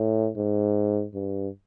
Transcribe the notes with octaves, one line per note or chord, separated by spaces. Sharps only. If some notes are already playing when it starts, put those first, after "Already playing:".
Already playing: A2
G#2
G2